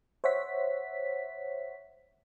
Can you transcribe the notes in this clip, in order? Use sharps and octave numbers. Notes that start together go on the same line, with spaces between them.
C5 C#5 E5 F#5 B6